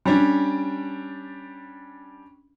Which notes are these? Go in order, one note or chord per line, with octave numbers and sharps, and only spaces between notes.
G3 C#4 D4